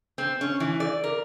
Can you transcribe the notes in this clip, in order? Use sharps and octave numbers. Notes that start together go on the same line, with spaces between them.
C4
C#4
E3
D5
A#4